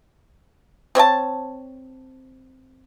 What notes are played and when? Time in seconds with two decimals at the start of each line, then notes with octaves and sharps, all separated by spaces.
0.95 C4 C#5 D#5 A5